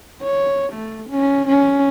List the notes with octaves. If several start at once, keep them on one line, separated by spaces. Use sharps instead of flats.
C#5
A3
C#4
C#4